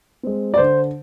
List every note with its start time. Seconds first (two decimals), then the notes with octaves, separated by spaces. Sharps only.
0.23 G#3 C4
0.54 D5
0.58 D3 C5